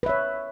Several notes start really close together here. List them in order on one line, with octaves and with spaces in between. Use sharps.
B4 E5 C#5